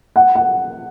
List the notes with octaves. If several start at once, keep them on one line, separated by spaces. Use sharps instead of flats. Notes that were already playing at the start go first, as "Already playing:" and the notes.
F#5
F#5